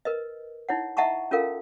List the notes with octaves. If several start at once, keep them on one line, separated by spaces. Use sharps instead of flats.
A#4 B4 D#5
D#4 E4 C#5 F#5
D#5 E5 F#5 A5 A#5 C#6
C#4 F4 A4 A#4 F5